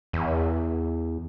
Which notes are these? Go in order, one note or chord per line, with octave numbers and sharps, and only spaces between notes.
E2